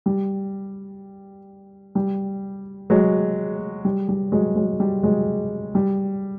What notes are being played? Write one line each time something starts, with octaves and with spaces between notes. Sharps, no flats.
G3
G3
F#3 G#3
G3
G3
F#3 G#3
F#3 G#3
G3
F#3 G#3
G3